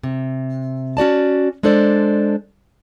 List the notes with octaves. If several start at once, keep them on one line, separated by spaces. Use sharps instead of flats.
C3
C#4 F#4 D5 A5
G#3 D4 A4 C5 D5